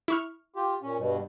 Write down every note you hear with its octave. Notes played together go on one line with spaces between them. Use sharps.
E4 C#6 F6
F4 G4
A#2 C#4
G2 B2